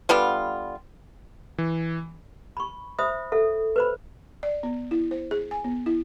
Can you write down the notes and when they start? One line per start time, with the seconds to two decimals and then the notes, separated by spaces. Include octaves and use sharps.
0.09 D3 G3 B3 F4
1.58 E3
2.57 B5 C#6
2.99 C5 E5 B5 D#6
3.32 A4 E5
3.76 B4 C5 B5
4.43 D5
4.63 B3
4.91 E4
5.11 C5
5.31 G#4
5.51 G#5
5.64 B3
5.86 E4